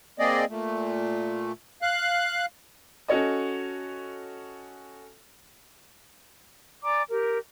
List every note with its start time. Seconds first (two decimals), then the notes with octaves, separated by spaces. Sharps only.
0.19 A#3 C4 G#4 D5 D#5
0.49 A#2 A3
1.82 F5 F#6
3.08 C#4 F#4 A4 C#5 D#5
6.83 D5 G#5 A#5 D6
7.08 G4 A#4